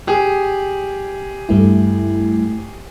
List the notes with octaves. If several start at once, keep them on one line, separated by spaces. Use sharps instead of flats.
G4 G#4
G2 A3 E4